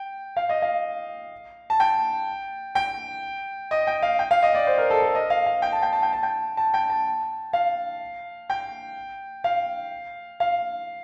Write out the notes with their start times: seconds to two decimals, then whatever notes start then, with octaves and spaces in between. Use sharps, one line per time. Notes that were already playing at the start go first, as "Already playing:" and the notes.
Already playing: G5
0.36 F5
0.49 D#5
0.62 F5
1.70 A5
1.80 G5
2.75 G5
3.71 D#5
3.87 G5
4.03 F5
4.19 G5
4.31 F5
4.43 D#5
4.55 D5
4.67 C5
4.78 A#4
4.90 A4
5.02 A4
5.15 D#5
5.30 F5
5.46 F5
5.62 G5
5.72 A5
5.82 G5
5.93 A5
6.03 G5
6.13 A5
6.23 G5
6.57 A5
6.74 G5
6.90 A5
7.53 F5
8.50 G5
9.44 F5
10.40 F5